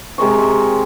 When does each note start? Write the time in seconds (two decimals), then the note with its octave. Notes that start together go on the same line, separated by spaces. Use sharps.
0.18 C3 G#3 A#4 C#6